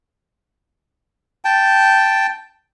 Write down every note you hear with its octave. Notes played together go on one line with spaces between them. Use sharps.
G5 A5